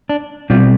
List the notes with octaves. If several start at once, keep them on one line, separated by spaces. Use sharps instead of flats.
D4
B2 G3 C4 F4